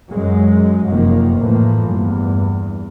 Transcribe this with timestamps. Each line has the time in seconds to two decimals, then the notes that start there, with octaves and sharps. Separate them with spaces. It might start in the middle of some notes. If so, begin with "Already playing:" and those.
0.10 F#2 F#3 G#3
0.88 F1 F#2 D#3 F3 A#3
1.38 A2 E3 F3 A3 A#3
1.88 E2 G2